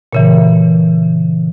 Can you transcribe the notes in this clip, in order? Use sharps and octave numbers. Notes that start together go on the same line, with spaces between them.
A#2 C#3 E3